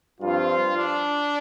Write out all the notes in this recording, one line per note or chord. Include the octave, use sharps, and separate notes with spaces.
G2 F3 C4 F4
D4